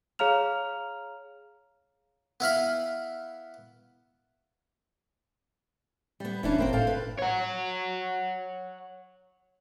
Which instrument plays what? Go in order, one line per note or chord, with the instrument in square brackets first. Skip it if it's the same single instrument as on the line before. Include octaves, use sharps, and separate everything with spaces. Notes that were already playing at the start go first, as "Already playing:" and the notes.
[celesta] G#4 C#5 F5 A#5 F6 F7
[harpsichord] B3 E4 F5 B5
[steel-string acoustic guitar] G3 B3
[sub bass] E1 [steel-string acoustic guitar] E3 C#4 D4
[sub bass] G1 [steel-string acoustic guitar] A#3 C4 C5
[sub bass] A2 [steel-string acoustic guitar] A4 F5 G5
[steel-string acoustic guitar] B4
[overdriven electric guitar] C#5 F#5